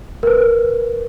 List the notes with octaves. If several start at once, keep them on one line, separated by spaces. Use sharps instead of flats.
A#4 B4